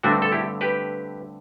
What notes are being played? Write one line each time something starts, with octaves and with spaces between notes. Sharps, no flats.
G2 D3 A3 C4 D4 F#4
A4
E4 G4
G4 B4